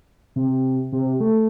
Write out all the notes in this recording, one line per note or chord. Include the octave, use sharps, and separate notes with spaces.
C3
C3
A3